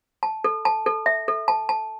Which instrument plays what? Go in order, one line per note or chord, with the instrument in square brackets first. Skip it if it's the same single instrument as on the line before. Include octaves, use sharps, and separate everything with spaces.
[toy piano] A5
A4
A5
A4
E5
A4
A5
A5